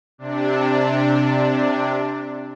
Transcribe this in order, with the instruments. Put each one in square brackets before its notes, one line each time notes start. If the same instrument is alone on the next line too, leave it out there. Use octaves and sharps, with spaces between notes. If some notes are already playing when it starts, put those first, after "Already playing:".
[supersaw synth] C3 D4